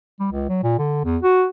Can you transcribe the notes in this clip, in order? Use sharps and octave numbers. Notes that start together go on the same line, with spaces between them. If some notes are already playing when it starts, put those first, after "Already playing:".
G3
C#2
F#3
A#2
D3
E2
F#4